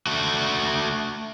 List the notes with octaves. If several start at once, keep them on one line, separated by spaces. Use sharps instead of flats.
A3 F#4